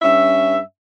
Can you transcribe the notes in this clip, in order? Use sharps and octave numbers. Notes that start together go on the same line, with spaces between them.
G2 C#4 E5